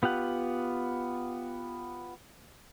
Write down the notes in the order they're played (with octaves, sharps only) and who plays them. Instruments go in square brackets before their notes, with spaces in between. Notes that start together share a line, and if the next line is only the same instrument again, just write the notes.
[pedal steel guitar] B3 F4 G4 F#5